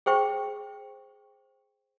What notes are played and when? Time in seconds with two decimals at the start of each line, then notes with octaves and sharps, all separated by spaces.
0.06 G#4 C5 G5 C#6